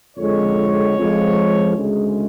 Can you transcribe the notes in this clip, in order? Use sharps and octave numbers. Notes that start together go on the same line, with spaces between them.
F2 D3 G#3 C#5
F2 F3 G#3
D2 C#3 G#3